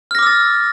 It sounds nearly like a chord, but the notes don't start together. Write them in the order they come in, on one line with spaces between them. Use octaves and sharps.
F6 A#6 D6 E6 A6